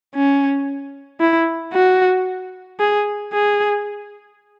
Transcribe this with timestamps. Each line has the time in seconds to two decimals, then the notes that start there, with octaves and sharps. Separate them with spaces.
0.15 C#4
1.21 E4
1.73 F#4
2.80 G#4
3.33 G#4